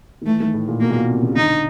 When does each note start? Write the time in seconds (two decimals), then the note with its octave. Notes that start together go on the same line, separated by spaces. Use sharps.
0.22 D#3
0.26 E3 A3
0.40 D#3
0.54 A2
0.68 A#2
0.81 B2 A#3
0.90 A#2
0.96 B2
1.09 C3
1.22 C#3
1.32 D#3
1.36 D3 D#4